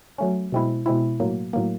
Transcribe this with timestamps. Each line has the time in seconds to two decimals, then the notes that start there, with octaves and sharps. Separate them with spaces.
0.18 F#3 A3 C#4
0.52 B2 G#3 C4 E4
0.86 B2 G#3 C4 E4
1.20 A2 F#3 A#3
1.53 A2 F#3 A#3